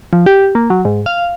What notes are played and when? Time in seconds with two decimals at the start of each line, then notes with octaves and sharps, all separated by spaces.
0.13 F3
0.26 G4
0.55 A#3
0.70 F#3
0.85 G#2
1.06 F5